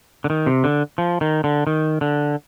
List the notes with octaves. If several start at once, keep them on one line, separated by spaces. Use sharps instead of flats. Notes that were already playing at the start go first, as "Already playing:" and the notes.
D3
D#3
C3
D3
F3
D#3
D3
D#3
D3